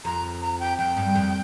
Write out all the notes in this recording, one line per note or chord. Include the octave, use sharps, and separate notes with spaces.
F2 A#5
A#5
G5
F2 G5
G2
F2